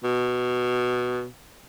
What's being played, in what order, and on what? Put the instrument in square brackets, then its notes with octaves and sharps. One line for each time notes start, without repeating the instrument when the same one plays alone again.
[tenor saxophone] B2